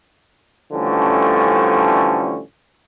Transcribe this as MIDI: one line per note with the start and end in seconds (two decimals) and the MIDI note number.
0.72 2.40 33
0.72 2.40 50
0.72 2.40 53
0.72 2.40 55
0.72 2.40 57
0.72 2.40 61